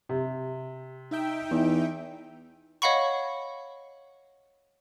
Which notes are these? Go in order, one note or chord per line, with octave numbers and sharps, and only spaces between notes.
C3
D#4 E5 G5
E2
C#5 D#5 F5 F#5 B5 C#6